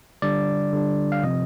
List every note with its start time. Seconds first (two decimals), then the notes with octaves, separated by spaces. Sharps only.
0.22 D3 G3 D4 D5
0.72 D3 G3 D4
1.12 F5
1.23 C3 F3 C4 D#5